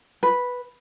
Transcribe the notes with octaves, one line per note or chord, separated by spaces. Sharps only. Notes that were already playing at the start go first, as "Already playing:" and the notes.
B4